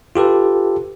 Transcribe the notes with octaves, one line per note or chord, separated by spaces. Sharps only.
F4 G4 A4 B4